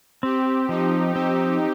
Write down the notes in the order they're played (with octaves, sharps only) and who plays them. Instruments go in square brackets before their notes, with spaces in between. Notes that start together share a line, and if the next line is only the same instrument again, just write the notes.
[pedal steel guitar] C4 [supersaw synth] G4
[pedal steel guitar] F3 [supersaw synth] D#4
[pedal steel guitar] C4 [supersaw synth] G4